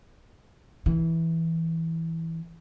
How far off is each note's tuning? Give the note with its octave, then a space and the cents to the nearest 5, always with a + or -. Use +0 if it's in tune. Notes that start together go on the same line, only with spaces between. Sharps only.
E3 -10